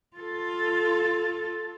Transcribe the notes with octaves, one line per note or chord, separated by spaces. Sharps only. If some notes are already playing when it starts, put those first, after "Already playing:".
F4 A4